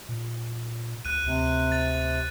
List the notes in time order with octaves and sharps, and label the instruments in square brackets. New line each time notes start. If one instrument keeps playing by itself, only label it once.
[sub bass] A#2
[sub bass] C#2 [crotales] F#6 D#7
[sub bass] D2 [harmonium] C3
[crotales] A6